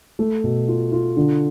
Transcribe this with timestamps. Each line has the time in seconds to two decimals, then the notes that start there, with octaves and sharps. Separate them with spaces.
0.19 A3
0.44 B2
0.68 F4
0.92 F4
1.17 D3